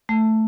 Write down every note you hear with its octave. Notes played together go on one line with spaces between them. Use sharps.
A3